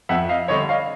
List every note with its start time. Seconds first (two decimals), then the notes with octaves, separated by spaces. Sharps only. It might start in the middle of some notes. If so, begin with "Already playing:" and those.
0.09 F2 E5 F#5
0.29 D#5 F5
0.48 D3 G3 C#5 D#5
0.69 D#5 F5